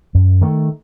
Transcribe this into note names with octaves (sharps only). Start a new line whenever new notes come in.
F#2
D#3 A3